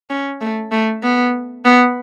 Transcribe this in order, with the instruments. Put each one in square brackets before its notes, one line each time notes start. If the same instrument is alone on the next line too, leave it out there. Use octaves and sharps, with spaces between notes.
[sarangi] C#4
A3
A3
B3
B3